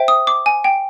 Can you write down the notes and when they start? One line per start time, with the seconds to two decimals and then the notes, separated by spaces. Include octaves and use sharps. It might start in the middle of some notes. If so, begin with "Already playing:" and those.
Already playing: C5 E5 G5
0.08 D#6
0.27 D6
0.46 G#5
0.64 G5